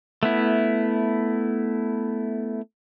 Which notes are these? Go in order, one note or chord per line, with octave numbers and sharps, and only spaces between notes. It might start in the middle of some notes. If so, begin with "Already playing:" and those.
A3 B3 E4